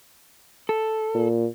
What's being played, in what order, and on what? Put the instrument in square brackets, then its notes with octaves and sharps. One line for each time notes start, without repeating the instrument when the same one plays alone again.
[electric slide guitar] A4
[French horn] A#2